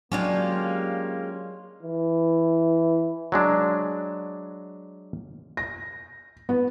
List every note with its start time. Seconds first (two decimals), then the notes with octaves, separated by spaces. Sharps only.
0.12 F#3 G#3 A#3 C#4 D4 F4 G4
1.83 E3
3.32 F#3 G#3 D4
5.57 A#6
6.49 B3